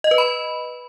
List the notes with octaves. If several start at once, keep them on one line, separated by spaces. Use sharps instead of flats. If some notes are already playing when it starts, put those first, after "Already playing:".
D#5
B4
B5